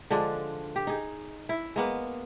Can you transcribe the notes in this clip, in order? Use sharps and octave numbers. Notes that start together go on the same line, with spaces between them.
D3 F3 G#3 D4
G4
D#4 G#4
E4
G#3 A#3 B3